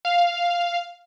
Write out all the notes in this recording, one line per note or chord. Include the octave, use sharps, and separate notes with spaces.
F5